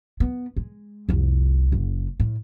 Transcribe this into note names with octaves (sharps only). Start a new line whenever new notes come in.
B3
G#3
F1 C2
F#1
A2